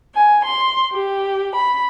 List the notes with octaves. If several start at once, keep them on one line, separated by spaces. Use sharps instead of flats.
G#5
C6
G4
B5